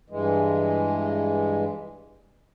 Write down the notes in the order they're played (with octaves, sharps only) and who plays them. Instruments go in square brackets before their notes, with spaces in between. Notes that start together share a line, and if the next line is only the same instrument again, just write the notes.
[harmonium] G2 E3 G#3